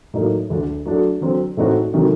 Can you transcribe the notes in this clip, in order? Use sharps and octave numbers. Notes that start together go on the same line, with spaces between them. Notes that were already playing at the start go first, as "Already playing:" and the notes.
A2 F#3 A#3 D#4 A4
D2 D3 A3 D4
F#3 A3 D4 F#4 A4
D3 F#3 C4
A2 A3 C4 D#4 F#4
C3 D#3 F#3 A3